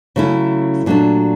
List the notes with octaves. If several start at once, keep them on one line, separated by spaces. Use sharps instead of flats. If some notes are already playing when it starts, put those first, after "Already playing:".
C#3 F#3 A3 C#4 E4
A#2 F#3 A3 D4